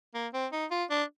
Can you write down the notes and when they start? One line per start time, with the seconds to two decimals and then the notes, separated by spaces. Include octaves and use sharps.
0.14 A#3
0.34 C4
0.52 D#4
0.71 F4
0.90 D4